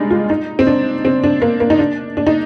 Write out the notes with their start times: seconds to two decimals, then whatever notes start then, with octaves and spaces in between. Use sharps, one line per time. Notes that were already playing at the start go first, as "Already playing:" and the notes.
Already playing: G3 G#3 D4 D#4
0.11 F4
0.30 D#4
0.59 C4
0.67 D4
1.05 C4
1.24 D4
1.42 A#3
1.60 A#3
1.70 D#4
1.79 D4
2.17 D4
2.27 D#4